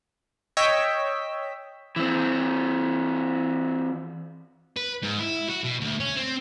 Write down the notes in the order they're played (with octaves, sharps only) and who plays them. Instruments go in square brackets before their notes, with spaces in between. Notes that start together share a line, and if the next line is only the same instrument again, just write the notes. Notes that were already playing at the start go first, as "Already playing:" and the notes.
[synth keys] C#5 D#5 G5 E6 B6
[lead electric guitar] E3 C4
[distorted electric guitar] B4
G#2
E4
F#4
B2
D2
C#4
C4